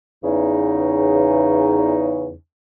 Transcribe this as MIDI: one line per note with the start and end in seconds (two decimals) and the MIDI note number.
0.23 2.32 40
0.23 2.32 49
0.23 2.32 63